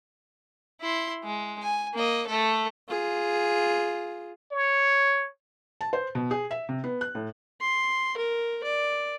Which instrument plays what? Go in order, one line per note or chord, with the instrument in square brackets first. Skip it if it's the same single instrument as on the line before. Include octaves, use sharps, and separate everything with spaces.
[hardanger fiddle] E4 C6
G#3
G#5
A#3 D#5
A3 A4
[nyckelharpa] F4 G#4
[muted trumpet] C#5
[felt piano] A5
C5
B2
G#4
E5
C3
B3
F#6
A2
[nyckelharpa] C6
A#4
D5